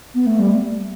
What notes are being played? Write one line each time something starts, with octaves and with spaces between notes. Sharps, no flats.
B3
A3
G3